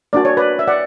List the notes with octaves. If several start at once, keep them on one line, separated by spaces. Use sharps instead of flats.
A#3 D4 F#4 D5
C#5
B4 D5
E5
D5 F#5